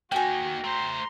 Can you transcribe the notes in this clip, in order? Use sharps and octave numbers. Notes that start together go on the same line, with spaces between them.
A#3 D#4 F#4 G5 G#5
A3 C5 A#5 C6